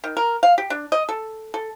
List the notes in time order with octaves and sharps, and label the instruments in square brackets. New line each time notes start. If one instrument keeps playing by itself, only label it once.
[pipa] D#3
A#4
F5
G4
D4
D#5
A4
A4